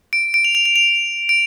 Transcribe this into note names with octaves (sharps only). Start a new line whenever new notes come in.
D7
D7
F7
F7
F7
F7
D7